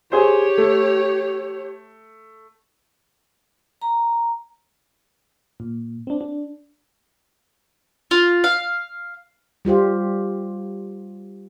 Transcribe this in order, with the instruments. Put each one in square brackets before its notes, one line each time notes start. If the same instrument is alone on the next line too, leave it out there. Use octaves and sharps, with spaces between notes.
[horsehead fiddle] G4 C#5 [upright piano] G#4 C5
[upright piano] A3
[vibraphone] A#5
[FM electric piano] A#2
C4 D4
D4
[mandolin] F4
F5
[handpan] G3 F4 G4 C5